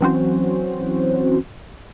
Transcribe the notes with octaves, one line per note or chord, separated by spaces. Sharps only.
E3 F#3 C4 C#4 F#4 C5